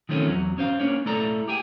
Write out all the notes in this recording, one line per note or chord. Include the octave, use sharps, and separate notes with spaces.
D#3 F3 A3 C4 C#4
E2 F#3
C#4 C5 F5
A#3 C#4 D4 C#5
A3 E4 A4 D5 A#5
G4 G#4 G5 G#5